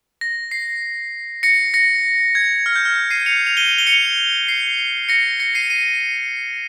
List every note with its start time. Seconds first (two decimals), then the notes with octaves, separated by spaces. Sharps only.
0.21 A#6
0.51 C7
1.43 A#6 C#7
1.74 A#6 C#7
2.35 G#6
2.66 F6
2.76 G6
2.85 F6
2.95 F6
3.11 C7 D#7
3.26 C#7 F7
3.47 F7
3.57 D#7 G7
3.78 G7
3.87 C#7 F7
4.48 C7
5.09 A#6 C#7
5.40 A#6 C#7
5.55 C7 D#7
5.70 C7 D#7